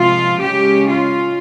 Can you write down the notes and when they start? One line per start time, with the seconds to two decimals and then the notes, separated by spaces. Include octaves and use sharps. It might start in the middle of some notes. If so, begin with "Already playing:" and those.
Already playing: C3 F3 G#3 F4
0.40 C#3 G#3 C#4 G4
0.87 F4